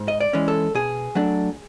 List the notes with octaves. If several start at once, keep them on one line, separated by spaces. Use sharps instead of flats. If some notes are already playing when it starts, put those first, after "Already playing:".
Already playing: G#2
D#5
D5
E3 G#3 C#4
A4
B2 G#4
F#3 A3 D4